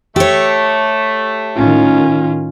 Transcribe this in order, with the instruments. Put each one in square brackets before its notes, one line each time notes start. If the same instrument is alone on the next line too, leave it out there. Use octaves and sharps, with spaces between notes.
[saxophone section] A3 [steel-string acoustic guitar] G4 C#5
[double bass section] A2 D#3 [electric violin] C#4 F4